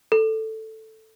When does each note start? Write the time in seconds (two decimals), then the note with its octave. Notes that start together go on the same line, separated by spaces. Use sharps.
0.12 A4